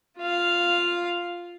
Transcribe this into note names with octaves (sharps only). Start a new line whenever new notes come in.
F4 F5